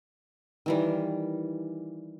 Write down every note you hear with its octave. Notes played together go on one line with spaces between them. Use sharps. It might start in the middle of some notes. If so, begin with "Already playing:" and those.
D#3 E3 G3